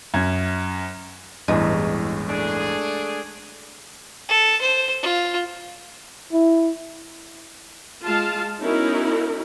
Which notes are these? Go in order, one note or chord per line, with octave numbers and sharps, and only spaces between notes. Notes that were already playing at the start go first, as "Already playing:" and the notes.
F#2 G#6
A1 E2 G2 G#3
A3 D4 G#4
A4
C5
F4
E4
G#3 F4 F5 A5
B3 C#4 D#4 E4 F#4 A#4